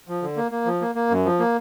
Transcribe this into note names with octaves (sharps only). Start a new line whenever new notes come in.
F3
D3
A#3
A#3
F3
A#3
A#3
F#2
F3
A#3